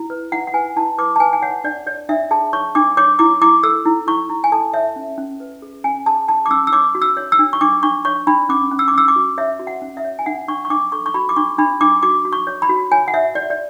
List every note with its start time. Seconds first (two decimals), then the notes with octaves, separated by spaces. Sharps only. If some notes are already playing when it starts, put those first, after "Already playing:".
Already playing: E4
0.10 B4
0.32 E4 F#5
0.47 F#5
0.54 B4 G#5
0.76 E4 A5
0.98 B4 D6
1.16 A5
1.20 B4 G#5
1.33 G#5
1.42 C#5 F#5
1.64 D4 D5
1.87 C#5 D5
2.09 D4 E5
2.31 G#4 A5
2.53 C#5 C#6
2.75 D4 D6
2.97 C#5 D6
3.19 E4 D6
3.41 E4 D6
3.63 A4 E6
3.86 E4
4.07 E4 C#6
4.30 E4
4.44 G#5
4.52 A4 A5
4.73 C#5 E5
4.96 C#4
5.18 C#4
5.40 B4
5.62 G#4
5.84 C#4 G#5
6.06 G#4 A5
6.28 G#4 A5
6.46 D6
6.50 C#4 E6
6.67 E6
6.72 C#5 D6
6.95 F#4
7.02 E6
7.17 C#5
7.32 E6
7.39 D4
7.53 C#6
7.61 D4 D6
7.83 D4 C#6
8.05 C#5 C#6
8.27 D4 B5
8.49 C#4 D6
8.71 C#4
8.79 E6
8.88 D6
8.94 C#4 E6
9.08 D6
9.16 F#4
9.38 C#5 E5
9.60 F#4
9.67 F#5
9.82 C#4
9.97 E5
10.04 C#5
10.19 G#5
10.26 D4 F#5
10.48 D4 C#6
10.65 C#6
10.70 D4 D6
10.92 A4 C#6
11.06 C#6
11.14 F#4 B5
11.29 D6
11.36 D4 C#6
11.59 D4 B5
11.81 D4 D6
12.03 F#4 D6
12.25 F#4
12.33 C#6
12.47 C#5
12.62 B5
12.69 F#4
12.92 C#5 G#5
13.08 F#5
13.14 C#5 E5
13.35 C#5 D5
13.50 D5